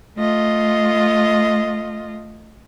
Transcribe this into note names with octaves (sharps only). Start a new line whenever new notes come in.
A3 F4 D#5